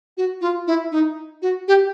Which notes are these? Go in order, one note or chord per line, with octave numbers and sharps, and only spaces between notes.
F#4
F4
E4
D#4
F#4
G4